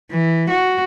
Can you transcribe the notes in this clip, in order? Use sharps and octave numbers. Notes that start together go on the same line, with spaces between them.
E3
F#4